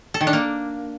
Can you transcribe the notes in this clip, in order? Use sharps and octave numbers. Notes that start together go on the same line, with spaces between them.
A4
D#3
D4
A#3